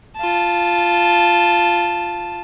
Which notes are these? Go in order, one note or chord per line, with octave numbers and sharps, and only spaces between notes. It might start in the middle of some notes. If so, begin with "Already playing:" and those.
F4 A5